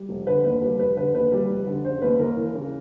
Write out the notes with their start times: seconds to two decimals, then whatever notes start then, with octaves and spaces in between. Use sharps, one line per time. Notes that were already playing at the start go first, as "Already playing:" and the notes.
Already playing: G3
0.09 F1
0.27 D3 B4
0.44 D#2 B4
0.62 G3 B4
0.79 F1 B4
0.97 D3 B4
1.14 D#2 B4
1.32 G3
1.49 F1
1.67 D3
1.84 C#3 C5
2.02 D#2 B4
2.19 D#2 A#4
2.37 E3
2.55 C#3